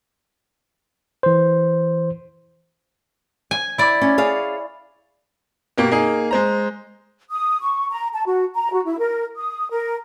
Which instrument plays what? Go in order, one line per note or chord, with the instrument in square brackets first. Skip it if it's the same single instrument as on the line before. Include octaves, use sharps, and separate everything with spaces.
[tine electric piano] E3 C5
[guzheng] G#5
E4 D5
[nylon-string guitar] C#4
G#4 C#5 F5
[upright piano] B2 A#3 G4
A#3 D#4 G#4
G#3 C5 A#5
[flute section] D#6
C#6
A#5
A5
F#4
A#5
F#4
E4
A#4
D#6
A#4